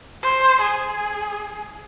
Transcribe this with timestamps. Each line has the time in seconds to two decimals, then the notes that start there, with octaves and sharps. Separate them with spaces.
0.23 C5
0.61 G#4